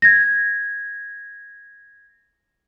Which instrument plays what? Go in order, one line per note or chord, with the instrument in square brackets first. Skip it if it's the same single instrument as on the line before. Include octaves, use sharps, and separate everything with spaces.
[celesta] G#6 A#6